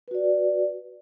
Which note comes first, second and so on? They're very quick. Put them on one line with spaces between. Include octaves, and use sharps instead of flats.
B4 F#4 D5